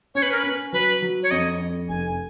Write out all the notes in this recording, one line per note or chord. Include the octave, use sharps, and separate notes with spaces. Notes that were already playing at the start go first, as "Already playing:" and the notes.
C#4 C#5
B4
A#4
C#4 B4
F#3 B4
F#3
C#5
F2 D#5
F2
F1 G#5